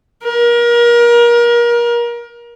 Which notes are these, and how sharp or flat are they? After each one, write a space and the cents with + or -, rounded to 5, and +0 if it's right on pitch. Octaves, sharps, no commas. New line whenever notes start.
A#4 +30